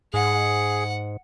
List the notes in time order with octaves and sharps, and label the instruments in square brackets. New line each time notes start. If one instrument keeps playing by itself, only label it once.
[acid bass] G#2 [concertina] G#4 [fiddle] F#5